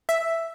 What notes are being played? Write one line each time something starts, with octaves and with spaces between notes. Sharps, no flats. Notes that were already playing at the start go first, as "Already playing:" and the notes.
E5